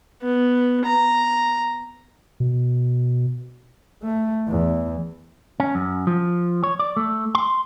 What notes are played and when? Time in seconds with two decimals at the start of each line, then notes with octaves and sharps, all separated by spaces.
0.22 B3
0.85 A#5
2.40 B2
4.03 A3
4.48 E2
5.60 C#4
5.75 F#2
6.07 F3
6.63 C#5
6.79 D5
6.97 A3
7.35 C6